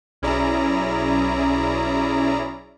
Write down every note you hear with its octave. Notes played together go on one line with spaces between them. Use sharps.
B1 C#4 E4 G#4 D5 A#5